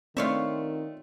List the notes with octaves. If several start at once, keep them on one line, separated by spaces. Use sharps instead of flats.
D#3 A3 C4 D4 F4 C#5 E5